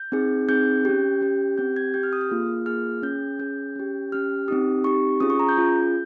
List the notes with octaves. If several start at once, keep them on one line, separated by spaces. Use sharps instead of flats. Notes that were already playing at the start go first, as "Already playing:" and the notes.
Already playing: G6
C4 D#4 G#4
C4 D#4 G#4 G6
C#4 G4
C#4 G4
C4 G4 G6
G#6
C4 G4 G6
F6
D#6
F6
A#3 F4 G#4
A#3 F4 G#4 F6
C#4 G#4 G6
C#4 G#4 G6
C#4 G4
C#4 G4 F6
C4 D#4 G4 D#6
C4 D#4 G4 C#6
C#4 F4 G#4 D#6
C#6
A#5
G6
C#4 F4 G#4